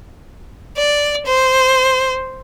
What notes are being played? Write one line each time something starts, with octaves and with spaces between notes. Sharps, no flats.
D5
C5